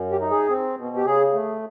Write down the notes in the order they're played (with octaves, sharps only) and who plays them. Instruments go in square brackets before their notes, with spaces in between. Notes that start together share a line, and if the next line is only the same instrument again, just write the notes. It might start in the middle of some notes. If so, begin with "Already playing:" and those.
Already playing: [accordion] F#2
G4
D#4
G#4
C4
B2
G4
C#3 G#4
A3